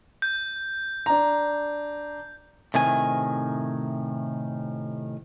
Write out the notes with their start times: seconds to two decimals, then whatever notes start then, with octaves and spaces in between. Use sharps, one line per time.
0.22 G6
1.06 D4 A#5
2.74 A2 C3 D#3 G#5